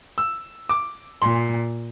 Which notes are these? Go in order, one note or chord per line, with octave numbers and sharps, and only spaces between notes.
E6
D6
A#2 C6